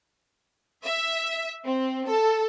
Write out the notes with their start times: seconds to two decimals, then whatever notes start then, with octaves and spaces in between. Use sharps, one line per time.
0.84 E5
1.66 C4
2.06 A4